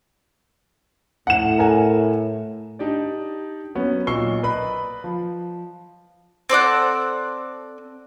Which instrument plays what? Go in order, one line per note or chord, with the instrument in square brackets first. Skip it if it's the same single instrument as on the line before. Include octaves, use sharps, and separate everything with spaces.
[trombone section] A2 [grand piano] F#5 E7
[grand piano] A#4 F#5 G#5
D4 D#4 G4 D5
F#3 B3 C#4
B1 A#2 C#6 E6 C7 G7
B4 D5 D#5 A#5 B5
F3
[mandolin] C4 A4 D5 F#5